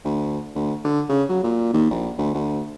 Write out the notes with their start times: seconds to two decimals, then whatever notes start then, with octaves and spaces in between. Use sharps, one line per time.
0.05 D2
0.55 D2
0.85 D3
1.09 C#3
1.29 F#3
1.44 A#2
1.73 D#2
1.91 A#1
2.18 D2
2.34 D2